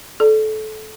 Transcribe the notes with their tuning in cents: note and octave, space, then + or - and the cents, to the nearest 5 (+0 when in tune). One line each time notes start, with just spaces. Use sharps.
A4 -25 D5 +0